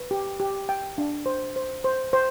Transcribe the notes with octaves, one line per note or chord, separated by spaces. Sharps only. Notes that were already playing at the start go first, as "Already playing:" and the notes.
Already playing: B4
G4
G4
G5
D4
C5
C5
C5
C5